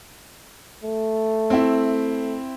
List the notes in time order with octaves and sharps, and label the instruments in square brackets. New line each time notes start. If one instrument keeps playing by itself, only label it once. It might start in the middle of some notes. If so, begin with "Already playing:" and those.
[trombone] A3
[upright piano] C4 E4